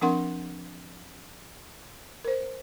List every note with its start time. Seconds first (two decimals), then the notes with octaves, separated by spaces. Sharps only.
0.01 F3 C4 D4 A#4 F#5 C6
2.25 A#4 C5